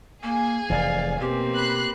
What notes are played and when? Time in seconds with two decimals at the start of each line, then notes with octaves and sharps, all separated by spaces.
0.23 A#3 G#4 G#5
0.70 F1 E3 D5 F5
1.20 B2 A#3 C4 G4
1.54 B5 F#6 C7